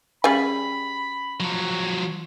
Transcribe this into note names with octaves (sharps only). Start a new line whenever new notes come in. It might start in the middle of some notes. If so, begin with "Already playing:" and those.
C#3 G3 G#5 B5
F3 F#3